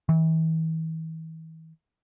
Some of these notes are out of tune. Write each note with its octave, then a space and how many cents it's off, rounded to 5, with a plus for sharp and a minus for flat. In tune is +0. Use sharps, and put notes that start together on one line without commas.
E3 -40